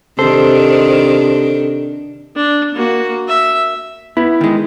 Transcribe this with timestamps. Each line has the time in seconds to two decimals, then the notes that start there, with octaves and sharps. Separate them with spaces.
0.19 C3 D#3 D4 A4 C5
2.36 D4
2.74 A#3 F#4
3.28 E5
4.17 B3 E4
4.41 D#3 G#3